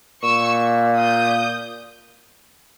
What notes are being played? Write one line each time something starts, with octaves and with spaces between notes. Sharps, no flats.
A#2 C#6 E6
D#6 G6